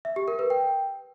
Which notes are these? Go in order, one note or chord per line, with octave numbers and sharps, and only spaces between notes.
E5
G4
A#4
B4
G5